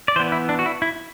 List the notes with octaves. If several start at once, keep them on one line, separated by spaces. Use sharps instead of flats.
D5
E3 B3 C5
E4
D4
F#4
E4
E4